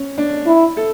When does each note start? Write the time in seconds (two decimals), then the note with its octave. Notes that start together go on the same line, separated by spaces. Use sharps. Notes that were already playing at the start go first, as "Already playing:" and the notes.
Already playing: C#4
0.18 D4
0.47 E4
0.77 A4